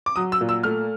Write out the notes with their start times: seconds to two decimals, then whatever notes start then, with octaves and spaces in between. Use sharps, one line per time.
0.06 D6
0.16 F#3 D#6
0.32 E6
0.41 A#2
0.49 E6
0.63 A3 F6